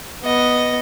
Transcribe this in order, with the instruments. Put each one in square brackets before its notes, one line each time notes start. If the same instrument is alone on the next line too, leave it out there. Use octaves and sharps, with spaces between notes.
[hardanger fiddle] B3 D#5